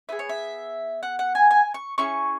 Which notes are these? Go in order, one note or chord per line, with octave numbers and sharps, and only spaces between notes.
B3 E4 G#4 E5
C#5
E5
F#5
F#5
G#5
G#5
C#6
C#4 E4 G#4 C#6